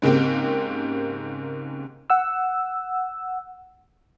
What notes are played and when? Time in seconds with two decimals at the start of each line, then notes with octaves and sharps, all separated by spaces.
0.02 G#2 C#3 A#3 C4 G4
2.10 F#5 E6